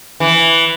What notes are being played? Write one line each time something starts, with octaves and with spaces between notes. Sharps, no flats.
E3